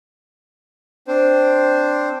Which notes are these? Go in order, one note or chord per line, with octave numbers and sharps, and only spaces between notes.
C4 D4 C5